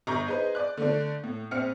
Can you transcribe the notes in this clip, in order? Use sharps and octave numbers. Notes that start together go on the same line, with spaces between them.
G1 A#5 C#6 G6
D#4 G#4 B4 C5
D5 F#6
D3 A3 D4
A2
A#1 C4 F6 C#7